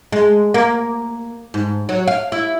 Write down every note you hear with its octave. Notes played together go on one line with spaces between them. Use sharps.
G#3
A#3
G#2
F#3
F5
E4